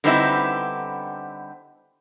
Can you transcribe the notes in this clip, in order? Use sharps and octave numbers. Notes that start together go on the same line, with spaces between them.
D3 G3 B3 C4 D#4 E4